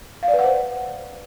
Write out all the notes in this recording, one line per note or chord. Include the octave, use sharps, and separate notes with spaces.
F5
D5
B4
F#5
C5